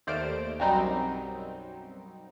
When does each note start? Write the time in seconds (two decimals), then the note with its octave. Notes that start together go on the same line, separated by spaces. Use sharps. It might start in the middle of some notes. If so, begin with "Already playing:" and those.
0.07 D#2 A3 C5 D5 F6 D7
0.59 B1 F#2 F#3 G3 C4 D#4